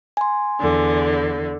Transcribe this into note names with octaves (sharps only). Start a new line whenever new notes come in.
G#5 C6
E2 D3